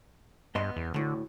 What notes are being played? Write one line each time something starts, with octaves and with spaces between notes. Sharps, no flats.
G2 B3 D#5 C6
E2
D2 A2 D3